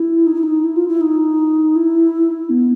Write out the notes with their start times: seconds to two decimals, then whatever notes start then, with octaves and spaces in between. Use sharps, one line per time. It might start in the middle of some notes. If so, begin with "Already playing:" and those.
Already playing: E4
0.27 D#4
0.35 E4
0.43 D#4
0.64 E4
0.76 F4
0.88 E4
1.01 D#4
1.76 E4
2.50 B3